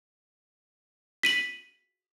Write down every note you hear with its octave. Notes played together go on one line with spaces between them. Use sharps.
B6 D#7 F#7